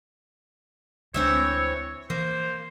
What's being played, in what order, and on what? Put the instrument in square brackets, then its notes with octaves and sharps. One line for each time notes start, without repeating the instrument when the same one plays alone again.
[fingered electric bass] D2 G#3 D4 [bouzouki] E3 C4 E5 [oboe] C#5
[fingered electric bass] E3 [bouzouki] A#3 [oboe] C5